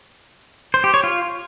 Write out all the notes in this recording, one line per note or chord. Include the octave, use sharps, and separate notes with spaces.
C5
G4
C#5
F4